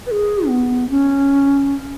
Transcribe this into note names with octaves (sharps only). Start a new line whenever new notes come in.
B4
G#4
B3
C#4